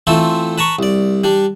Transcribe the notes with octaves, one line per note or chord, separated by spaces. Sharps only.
E3 A3 C4 F4 A4 C5
B4 A5 A#5 C#6
C2 D5
G3 D4